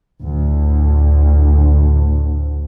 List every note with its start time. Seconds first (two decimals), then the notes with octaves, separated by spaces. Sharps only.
0.23 D2 A2